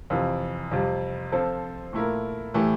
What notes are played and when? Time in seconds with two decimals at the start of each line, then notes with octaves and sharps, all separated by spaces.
0.10 F2 C3 E3
0.71 F2 C3 G3
1.32 F3 C4 F4 A4 C5
1.93 A#2 A3 E4 A#4
2.54 A2 E3 A3 E4 G4